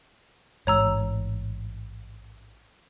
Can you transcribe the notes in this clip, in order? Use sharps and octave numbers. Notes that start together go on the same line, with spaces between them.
A1 G#2 C#5 A#5 E6